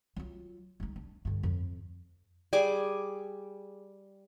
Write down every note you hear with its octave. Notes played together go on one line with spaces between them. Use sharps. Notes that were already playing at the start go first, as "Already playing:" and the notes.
F#3 F4
G3 D#4
D4
G2 D3
F2
G3 G#4 G#5 D6